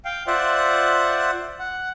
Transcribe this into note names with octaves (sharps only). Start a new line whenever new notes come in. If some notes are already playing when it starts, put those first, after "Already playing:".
F5 G5
F4 C5 D5 E5 F#5
F#5